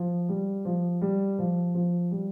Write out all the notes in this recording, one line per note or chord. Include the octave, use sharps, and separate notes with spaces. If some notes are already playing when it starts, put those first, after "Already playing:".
Already playing: F3
G3
F3
G3
F3
F3
G3